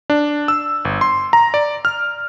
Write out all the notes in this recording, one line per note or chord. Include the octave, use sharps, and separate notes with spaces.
D4
E6
G1
C6
A#5
D5
F6